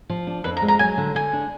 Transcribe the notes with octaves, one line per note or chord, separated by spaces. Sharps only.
F3
D4
F2 B4
A#5
G#3
A#5
F#3 G#5
D3
D3 G#5
D4